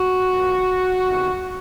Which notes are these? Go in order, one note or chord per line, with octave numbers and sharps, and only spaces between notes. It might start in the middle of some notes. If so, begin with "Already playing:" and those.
Already playing: F#4
A#2 F3
E2 C3 D#3